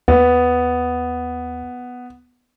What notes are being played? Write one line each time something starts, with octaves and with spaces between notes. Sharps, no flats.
D#2 B3